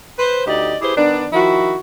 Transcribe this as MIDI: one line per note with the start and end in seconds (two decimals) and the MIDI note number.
0.19 0.42 71
0.19 0.42 72
0.46 0.75 38
0.46 0.75 63
0.46 0.75 67
0.46 0.75 74
0.46 0.75 75
0.82 0.96 64
0.82 0.96 67
0.82 0.96 68
0.82 0.96 71
0.82 0.96 72
0.96 1.27 51
0.96 1.27 59
0.96 1.27 62
1.33 1.75 51
1.33 1.75 53
1.33 1.75 64
1.33 1.75 66